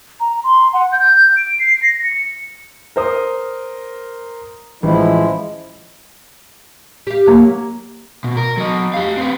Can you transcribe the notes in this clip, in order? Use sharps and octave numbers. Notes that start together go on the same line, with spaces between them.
A#5
C6
F#5
G6
D7
C7
A#6
C#7
A#4 C5 D#6
A1 F3 G#3 E4
G4 F5
F#3 A#3
B2
A#4
F#3 D#5
G4 F5
C4 B4